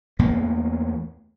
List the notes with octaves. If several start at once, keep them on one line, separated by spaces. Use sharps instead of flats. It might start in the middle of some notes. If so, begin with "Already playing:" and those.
E2 A2 A#3 B3